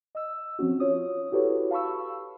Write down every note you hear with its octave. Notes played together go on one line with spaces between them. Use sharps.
D#5 E6
F3 C4 C#4 F#4
F4 C#5 D#6
E4 F#4 G4 A4 B4 C#5
F5 A5 B5 C#6 E6